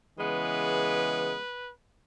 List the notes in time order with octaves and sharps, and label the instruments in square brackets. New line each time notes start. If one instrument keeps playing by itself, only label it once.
[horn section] C#3 E3 G#3 B3 B4